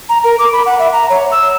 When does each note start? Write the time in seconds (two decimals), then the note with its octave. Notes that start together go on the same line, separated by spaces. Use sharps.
0.09 A#5
0.24 A#4
0.39 D6
0.53 B5
0.66 F#5
0.79 E5
0.93 A#5
1.10 C#5
1.32 E6